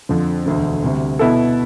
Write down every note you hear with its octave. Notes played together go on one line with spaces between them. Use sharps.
F2 D3 F3
E1 D2 D3
D2 C3 G3
B2 B3 E4 A4